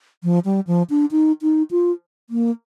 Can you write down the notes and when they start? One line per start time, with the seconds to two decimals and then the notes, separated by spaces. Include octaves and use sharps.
0.24 F3
0.45 G3
0.67 F3
0.90 D4
1.11 D#4
1.42 D#4
1.71 F4
2.30 A#3